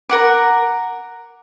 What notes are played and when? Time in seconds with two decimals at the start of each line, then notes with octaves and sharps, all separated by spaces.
0.09 A#4 F#5 D6